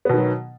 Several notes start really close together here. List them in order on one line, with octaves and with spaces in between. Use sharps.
B3 B2 D#3 F#3